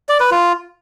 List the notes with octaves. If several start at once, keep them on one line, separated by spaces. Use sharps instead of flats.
D5
B4
F4